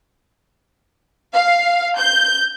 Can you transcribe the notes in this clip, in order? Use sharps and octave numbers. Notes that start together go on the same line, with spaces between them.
F5
G6